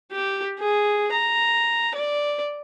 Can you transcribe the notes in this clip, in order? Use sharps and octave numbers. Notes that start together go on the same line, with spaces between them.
G4
G#4
A#5
D5